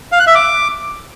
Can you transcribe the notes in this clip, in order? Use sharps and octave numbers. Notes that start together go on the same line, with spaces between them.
F5
F#6
E5
D6